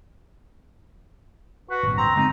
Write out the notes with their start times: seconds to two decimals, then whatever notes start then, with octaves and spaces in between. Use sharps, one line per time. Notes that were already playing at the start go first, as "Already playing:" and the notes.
1.70 F#4 B4
1.83 D#1 G#1 D2
1.98 C4 A#5
2.15 F#1 G#3 C4 D#4